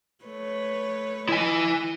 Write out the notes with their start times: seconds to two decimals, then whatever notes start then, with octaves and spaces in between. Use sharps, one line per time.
0.25 A3 B4 C#5
1.29 E4 D#5 G#5